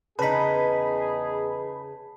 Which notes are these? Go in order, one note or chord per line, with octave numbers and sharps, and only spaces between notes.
E2 C#3 D#4 G#4 B4 A5 B5 B6